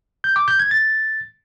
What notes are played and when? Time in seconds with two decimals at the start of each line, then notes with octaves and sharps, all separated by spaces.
0.24 G6
0.36 D6
0.48 G6
0.59 G#6
0.71 A6